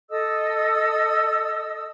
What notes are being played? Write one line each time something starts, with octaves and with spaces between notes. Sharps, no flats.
A4 D#5 D#6 E6